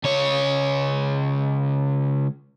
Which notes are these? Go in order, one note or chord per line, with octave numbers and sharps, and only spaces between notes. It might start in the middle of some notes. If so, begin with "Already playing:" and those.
C#2 C#5